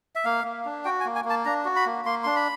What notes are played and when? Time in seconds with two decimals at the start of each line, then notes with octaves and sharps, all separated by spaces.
0.15 E5
0.25 A#3 F5
0.45 A#3
0.65 D4
0.85 F#4 G5
1.00 G#5
1.05 A#3
1.16 G#5
1.25 A#3
1.30 A5
1.45 D4 A#5
1.65 F#4
1.76 B5
1.86 A#3
2.05 A#3 C6
2.23 D4 C6
2.36 B5